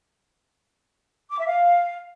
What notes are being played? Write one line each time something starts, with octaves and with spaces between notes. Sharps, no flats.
D6
E5
F5